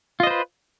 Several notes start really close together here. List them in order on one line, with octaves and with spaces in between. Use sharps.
F4 D#5 C5 B4